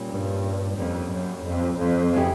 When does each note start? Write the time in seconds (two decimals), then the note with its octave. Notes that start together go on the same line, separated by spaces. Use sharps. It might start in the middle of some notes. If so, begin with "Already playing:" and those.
Already playing: A#2 G3 A#3 C#4 F4
0.09 G2
0.78 F2 G3 A#3 C#4
1.12 F#2
1.46 F2
1.79 F2
2.14 C#3 F#3 B3 E4 G4